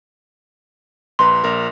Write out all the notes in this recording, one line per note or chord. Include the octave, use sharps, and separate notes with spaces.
A#1 B4 A#5 C6
A#1 A#4